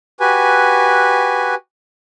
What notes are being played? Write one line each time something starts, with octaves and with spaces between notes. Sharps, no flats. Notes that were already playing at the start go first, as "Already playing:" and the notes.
F#4 G4 B4 G#5